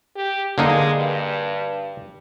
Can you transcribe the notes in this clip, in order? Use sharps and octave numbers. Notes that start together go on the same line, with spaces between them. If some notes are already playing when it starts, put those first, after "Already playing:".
G4
D3 G#3 A#3 D#4
G2